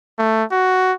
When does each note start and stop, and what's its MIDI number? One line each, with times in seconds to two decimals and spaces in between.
0.18 0.44 57
0.51 0.93 66